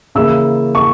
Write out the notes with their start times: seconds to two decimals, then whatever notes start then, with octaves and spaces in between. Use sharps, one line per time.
0.15 C#3 E3 A#3 E4 E6
0.75 C#6